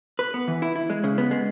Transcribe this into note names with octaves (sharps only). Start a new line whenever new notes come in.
B4
B3
E3
E4
E4
G#3
C#3
B3
G#3